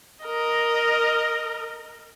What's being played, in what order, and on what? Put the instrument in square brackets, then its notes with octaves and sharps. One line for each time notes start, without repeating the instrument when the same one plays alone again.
[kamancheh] A#4 D#5